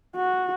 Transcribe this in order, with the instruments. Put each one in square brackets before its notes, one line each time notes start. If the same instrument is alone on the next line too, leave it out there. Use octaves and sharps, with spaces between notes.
[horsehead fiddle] F#4